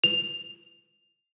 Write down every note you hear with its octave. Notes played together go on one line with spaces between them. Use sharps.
F7